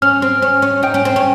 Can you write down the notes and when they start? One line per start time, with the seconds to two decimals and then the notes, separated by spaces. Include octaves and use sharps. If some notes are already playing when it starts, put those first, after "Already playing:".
0.02 C#4 F6
0.22 C4
0.42 C#4
0.62 C#4
0.83 D#4 G5
0.94 C#4
1.05 C4
1.16 C#4